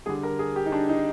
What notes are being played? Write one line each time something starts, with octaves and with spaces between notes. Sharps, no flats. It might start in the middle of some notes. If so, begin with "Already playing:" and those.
D3 G3 G#4
A#4
G#4
G4
D#4
D4
D#4